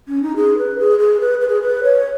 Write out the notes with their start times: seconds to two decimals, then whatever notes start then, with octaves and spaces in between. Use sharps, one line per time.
0.08 C#4
0.23 D#4
0.36 G#4
0.58 B4
0.79 G#4
0.99 G#4
1.20 B4
1.41 B4
1.48 G#4
1.62 B4
1.83 C#5